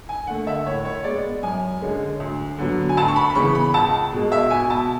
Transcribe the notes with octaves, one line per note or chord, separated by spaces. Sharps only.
G#5
D3 A3 F#5
E5
A2 C#5
C#5
G#3 B3 D5
F#2 G#5
D3 G#3 C#4
D2
D3 F#3 B3
G#5
D2 A5
C#6
B5
B5
C#3 E3 B3 C#6
B5
C#2 A5
B2 G#3
E5
B2 G#5
A5